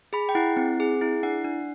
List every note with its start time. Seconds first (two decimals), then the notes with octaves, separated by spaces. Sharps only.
0.13 G#4 B5
0.29 G5
0.35 E4 F#5
0.57 C4
0.80 G#4
1.01 E4
1.23 D4 F#5
1.45 D4